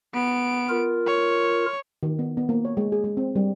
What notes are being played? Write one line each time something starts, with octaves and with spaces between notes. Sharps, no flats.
B3 D7
F4 A#4
C#5
D#3
B3
B3
A#3
C#5
G#3
G#4
G#3
C4
G3